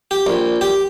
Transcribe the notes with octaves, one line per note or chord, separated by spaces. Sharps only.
G4
A#1
G4